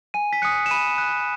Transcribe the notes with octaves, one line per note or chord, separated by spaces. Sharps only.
G#5 D#7
B6
D#6 F#6 C#7
E7
B5 D#7
F#6